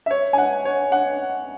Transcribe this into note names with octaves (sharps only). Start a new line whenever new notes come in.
E5
C#5
G#5
F#5
C#5
F#5